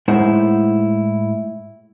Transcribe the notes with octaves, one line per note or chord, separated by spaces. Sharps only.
A2 G#3 D#4 E4 C5 F#5